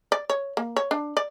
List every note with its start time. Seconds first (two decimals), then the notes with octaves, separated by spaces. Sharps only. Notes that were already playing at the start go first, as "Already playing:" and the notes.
0.12 D5
0.30 C#5
0.57 A#3
0.76 C#5
0.91 D4
1.17 D5